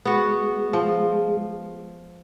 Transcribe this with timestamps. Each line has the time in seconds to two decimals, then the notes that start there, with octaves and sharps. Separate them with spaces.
0.05 G#3 B3 F#4
0.73 F3